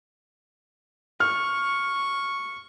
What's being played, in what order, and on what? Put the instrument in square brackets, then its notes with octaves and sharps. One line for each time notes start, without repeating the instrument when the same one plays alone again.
[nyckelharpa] C#6 [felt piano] F6